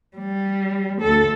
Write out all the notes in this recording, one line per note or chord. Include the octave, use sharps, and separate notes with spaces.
G3
D2 A4